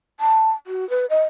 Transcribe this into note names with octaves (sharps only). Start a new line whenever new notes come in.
A5
F#4
B4
D#5